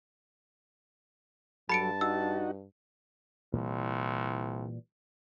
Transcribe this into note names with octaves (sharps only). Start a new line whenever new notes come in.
G2 F#3 A4 A5 B5 C#7 D7
D#4 F#4 E6
C2 A#2 E3 G3